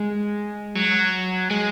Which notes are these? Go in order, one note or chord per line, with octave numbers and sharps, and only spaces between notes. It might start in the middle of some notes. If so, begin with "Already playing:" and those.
Already playing: G#3
F#3
G#3